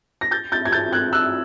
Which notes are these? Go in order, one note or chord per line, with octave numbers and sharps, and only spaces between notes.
A#6
G6 A6
G6 A6
G#6
G6 A6
F#6 G#6
E6 F#6